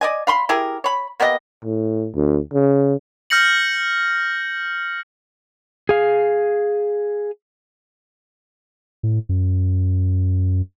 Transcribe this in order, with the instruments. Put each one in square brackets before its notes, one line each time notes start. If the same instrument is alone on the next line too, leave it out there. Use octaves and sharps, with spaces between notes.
[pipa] D5 D#5 G#5
F5 B5 C6
E4 G4 G#4 A#4
C#5 B5
A#3 B3 G4 D#5
[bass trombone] A2
D2
C#3
[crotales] F6 G6 A#6 C#7 F#7
[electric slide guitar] G#4 F5
[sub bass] A2
F#2